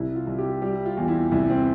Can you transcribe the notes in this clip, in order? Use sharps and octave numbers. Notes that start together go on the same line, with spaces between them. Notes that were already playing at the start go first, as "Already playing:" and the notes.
Already playing: C2 E4
F4
C2
G4
G3 G4
F4
E2
E4
C2 E4
C4